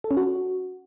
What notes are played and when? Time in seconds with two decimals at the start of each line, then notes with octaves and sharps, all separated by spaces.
0.04 A4
0.11 C#4
0.17 F#4